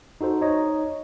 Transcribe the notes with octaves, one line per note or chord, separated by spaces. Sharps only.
D#4 F#4 A4 C5
D#4 C#5 D#5